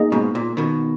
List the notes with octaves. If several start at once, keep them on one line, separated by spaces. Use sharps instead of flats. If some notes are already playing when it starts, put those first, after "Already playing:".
Already playing: A#3 D#4 G#4 D#5
G#2 B2
A#2
B2 D#3